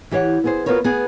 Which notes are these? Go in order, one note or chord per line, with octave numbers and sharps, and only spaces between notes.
E3 G4 C#5 F5 F#5
B3 G#4 C5
B3 F4 F#4 A#4 B4 C#5
B3 G#4